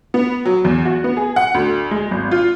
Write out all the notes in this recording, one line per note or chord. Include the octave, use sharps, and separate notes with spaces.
B3
F#3
E2
F#4
B3
G#4
F#5
D2
G#3
G#1
F4